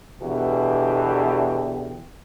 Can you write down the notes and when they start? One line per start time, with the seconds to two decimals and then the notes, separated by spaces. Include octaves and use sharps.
0.22 E2 B2 D3 E3 G4